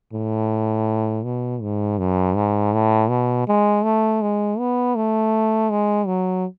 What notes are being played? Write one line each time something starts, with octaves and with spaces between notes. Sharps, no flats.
A2
B2
G#2
F#2
G#2
A2
B2
G#3
A3
G#3
B3
A3
G#3
F#3